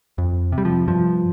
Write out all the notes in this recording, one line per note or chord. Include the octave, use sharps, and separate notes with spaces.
F2
C3
G3
F3
G2 F3